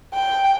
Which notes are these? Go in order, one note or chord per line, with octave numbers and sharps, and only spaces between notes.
G5